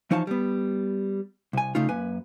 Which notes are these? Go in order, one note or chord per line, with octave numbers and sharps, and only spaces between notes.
E3 F3 D#4 C#5 F5 A5
G3 B3
C2 G#5
C#3 A3 D#4 F4
F#2 A#3 B4 G#5